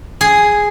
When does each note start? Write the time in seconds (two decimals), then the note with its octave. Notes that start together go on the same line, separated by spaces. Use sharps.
0.21 G#4